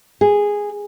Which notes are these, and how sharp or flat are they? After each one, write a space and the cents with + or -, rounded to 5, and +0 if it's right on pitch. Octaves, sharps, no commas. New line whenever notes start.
G#4 -10